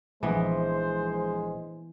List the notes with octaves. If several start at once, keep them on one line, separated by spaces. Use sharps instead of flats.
A#1 E3 G#3 B3 C5 D#5